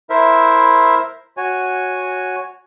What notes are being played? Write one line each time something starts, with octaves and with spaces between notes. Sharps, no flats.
E4 A#4 C5 E5
F#4 C#5 G#5